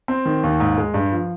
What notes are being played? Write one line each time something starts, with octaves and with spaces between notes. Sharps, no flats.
C4
D#3
D#2
G#2
G#3
G2
F3